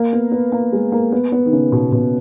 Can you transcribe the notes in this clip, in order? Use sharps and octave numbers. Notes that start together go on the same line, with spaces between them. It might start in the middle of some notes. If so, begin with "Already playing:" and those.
Already playing: A#3
B3
B3
A#3
G#3
A#3
B3
B3
D#3
C#3
B2
B2